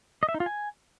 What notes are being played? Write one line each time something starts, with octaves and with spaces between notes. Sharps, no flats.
D#5
E5
D#4
F4
G#5